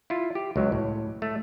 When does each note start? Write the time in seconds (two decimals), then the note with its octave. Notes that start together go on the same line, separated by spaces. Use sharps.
0.10 E4 F4
0.35 G4
0.56 C#2 F#3
0.72 A2
1.22 A3